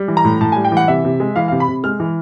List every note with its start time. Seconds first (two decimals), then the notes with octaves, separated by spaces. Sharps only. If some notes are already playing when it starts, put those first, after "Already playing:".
Already playing: G3
0.08 E3
0.17 A#5
0.25 A2
0.41 A2 A5
0.52 G3 G#5
0.65 G5
0.72 E3 F#5
0.88 C3 E5
1.05 C3
1.20 G#3
1.36 E3 F5
1.48 C3 F5
1.60 B5
1.68 C3
1.84 G#3 F6
2.00 E3